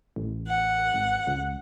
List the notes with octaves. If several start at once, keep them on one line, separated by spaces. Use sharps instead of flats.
A1
F#5
G#1
C#2